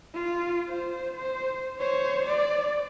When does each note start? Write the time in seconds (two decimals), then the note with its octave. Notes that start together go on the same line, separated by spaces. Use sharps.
0.15 F4
0.69 C5
1.16 C5
1.79 C5 C#5
2.25 D5